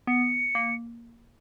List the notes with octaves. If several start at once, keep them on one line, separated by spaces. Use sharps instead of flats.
B3 C#7
A#3